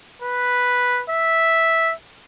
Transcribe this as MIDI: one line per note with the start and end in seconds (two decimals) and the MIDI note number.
0.22 1.02 71
1.10 1.93 76